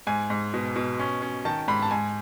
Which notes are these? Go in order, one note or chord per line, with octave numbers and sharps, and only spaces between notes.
G#2 G#5
G#2
B2
B2
C#4
C#4
D#3 A5
G#2 B5
A5
G#2 G#5